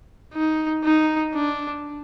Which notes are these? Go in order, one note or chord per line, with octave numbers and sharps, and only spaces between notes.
D#4
D#4
D4